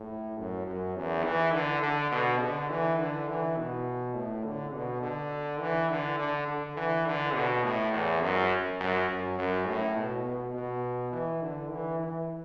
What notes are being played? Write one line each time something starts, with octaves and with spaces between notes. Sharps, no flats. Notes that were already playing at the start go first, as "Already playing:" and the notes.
Already playing: A2
F#2
F#2
E2
E3
D3
D3
B2
D3
E3
D3
E3
B2
A2
D3
B2
D3
E3
D3
D3
D3
E3
D3
B2
A2
E2
F#2
F#2
F#2
F#2
A2
B2
B2
B2
E3
D3
E3
E3